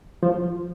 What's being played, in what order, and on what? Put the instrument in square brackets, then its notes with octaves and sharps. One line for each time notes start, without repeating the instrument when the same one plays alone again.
[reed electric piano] F3